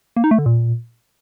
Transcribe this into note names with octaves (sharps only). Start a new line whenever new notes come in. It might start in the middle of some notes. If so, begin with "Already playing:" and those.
A#3
D#4
A3
D3
A#2